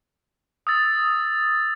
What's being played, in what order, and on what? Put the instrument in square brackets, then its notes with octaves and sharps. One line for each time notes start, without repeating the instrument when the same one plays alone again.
[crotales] D#6 E6 A6